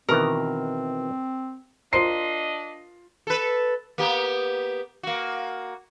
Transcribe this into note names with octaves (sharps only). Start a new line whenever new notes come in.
B2 D#3 E3 C4 A#4
D4 F4 A#4 C5 D#5 C7
A4 B4
A#3 B3 G4
A#3 F#4